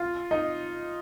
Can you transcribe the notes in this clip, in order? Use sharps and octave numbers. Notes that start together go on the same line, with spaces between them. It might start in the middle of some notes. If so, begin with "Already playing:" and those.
Already playing: F4
D#4